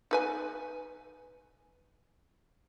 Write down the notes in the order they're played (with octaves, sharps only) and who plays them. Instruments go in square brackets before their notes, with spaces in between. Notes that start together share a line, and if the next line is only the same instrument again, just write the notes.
[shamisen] D#4 B4 G#5